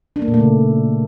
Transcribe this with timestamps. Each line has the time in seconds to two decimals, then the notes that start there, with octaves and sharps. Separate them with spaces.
0.16 D4
0.22 A#3
0.28 A#2
0.34 A3
0.40 C#3